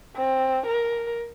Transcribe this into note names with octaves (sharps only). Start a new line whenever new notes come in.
C4
A#4